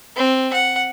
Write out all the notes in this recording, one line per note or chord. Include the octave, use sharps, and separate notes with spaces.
C4
F#5